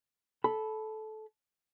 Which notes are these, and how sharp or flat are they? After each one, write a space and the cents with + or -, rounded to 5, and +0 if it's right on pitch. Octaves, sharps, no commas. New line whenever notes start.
A4 -15 B5 +0